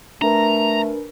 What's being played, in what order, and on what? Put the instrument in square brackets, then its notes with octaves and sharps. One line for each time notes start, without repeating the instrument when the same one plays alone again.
[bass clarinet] A3 [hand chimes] D4 A#4 B4 [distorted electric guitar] A#5